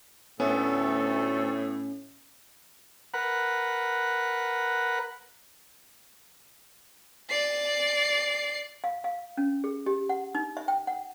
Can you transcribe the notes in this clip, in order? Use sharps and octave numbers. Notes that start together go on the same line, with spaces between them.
D2 A2 A3 B3 C#4 A4
A#4 B4 F#5
D5 C7
F5
F5
C#4
G#4
G4
F#5
D#4
E5
G5
F#5